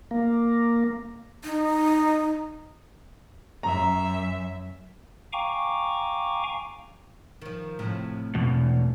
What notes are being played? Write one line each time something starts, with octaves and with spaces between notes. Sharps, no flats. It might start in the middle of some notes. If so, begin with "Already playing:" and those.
A#3
D#4
F#2 E5 A#5
F5 G5 G#5 A#5 C#6 D6
D#3 F3
A2 C3 F3
E2 B2